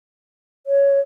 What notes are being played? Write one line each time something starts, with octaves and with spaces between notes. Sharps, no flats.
C#5